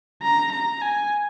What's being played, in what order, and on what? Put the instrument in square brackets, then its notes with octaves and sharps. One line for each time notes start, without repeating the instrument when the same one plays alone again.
[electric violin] A#5
A#5
G#5